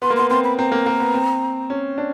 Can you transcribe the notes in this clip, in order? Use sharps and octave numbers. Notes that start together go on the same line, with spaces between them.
B3 C6
A#3
B3 C6
C4 C6
B5
C4 A#5
A#3
A#3
B3
C4
C#4
D4